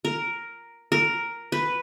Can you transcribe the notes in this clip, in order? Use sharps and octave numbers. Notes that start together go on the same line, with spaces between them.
A#4
A#4
B4